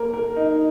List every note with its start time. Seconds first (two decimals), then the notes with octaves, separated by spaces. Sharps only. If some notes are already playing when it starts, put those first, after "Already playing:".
Already playing: A#3 A#4
0.13 A#4
0.36 D#4